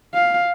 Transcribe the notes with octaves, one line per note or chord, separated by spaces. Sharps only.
F5